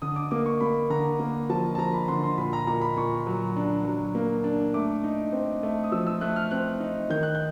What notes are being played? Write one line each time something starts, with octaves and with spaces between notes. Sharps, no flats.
D3 D#6
D6
A#3 D6
C#6
A#3 B5
D3 A#5
A#3
F3 A5
A5
F3 A#5
B5
D3 C6
C6
A#2 B5
A#5
A#2 A#5
B5
A#2 C#6
F#3
D4
F#3
A#3
D4
A3 D6
D#4
C4
A3
D#6
F3 E6
E6
A3 F#6
F6
C4 F#6
D#4
D#3 G6
F#6
G6